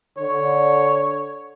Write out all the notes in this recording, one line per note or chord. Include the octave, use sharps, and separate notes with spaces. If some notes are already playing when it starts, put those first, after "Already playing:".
D3 C#5